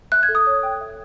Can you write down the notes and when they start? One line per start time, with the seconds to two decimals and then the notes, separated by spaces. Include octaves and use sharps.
0.12 E5 F#6
0.23 G#6
0.29 A4
0.35 D#6
0.47 C#5
0.63 G5
0.81 E5